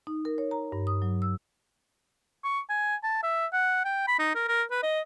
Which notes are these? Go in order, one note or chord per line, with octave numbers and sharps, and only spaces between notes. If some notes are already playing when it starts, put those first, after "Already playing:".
D#4
A#4
C#5
A#5
G2
D#6
F#3
E6
C#6
G#5
A5
E5
F#5
G5
B5
D#4
A#4
A#4
B4
D#5